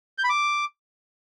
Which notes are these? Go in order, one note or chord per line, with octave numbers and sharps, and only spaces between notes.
G6
B5
D6